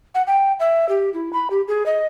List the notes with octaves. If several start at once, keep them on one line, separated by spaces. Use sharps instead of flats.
F#5
G5
E5
G4
E4
B5
G4
G#4
D#5